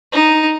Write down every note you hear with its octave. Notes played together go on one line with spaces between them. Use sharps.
D#4